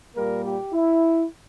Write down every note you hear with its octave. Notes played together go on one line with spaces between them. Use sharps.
A#2 G3 A#3 A#4
G4
E4